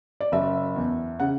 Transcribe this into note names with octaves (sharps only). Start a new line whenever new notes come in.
D5
F#1 E5
E2
C#3 F#5